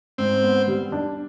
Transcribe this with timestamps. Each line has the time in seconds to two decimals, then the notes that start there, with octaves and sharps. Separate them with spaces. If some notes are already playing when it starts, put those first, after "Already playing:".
0.18 G#2 C4
0.43 B3
0.68 G3
0.92 D4